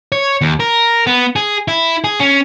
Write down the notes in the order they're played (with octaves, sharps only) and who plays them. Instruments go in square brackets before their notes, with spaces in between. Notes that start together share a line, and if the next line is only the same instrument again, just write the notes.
[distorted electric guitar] C#5
D#2
A#4
B3
G#4
E4
G#4
C#4